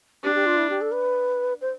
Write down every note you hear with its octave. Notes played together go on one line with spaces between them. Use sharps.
D4 G4
G4
F4
E4
G4
A4
B4
C5